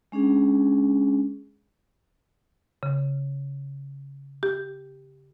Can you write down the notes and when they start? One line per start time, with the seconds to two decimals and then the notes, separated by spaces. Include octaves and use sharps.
0.12 G#3 C#4 D4 G#4
2.83 C#3
4.43 G4